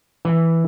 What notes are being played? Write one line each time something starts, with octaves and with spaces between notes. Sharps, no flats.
E3